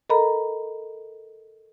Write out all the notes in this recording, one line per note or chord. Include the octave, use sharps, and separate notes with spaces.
A4 A#4 D#5 A#5 B5